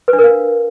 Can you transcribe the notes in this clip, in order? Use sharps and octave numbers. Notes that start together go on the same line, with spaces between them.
B4
D4
A#4
F5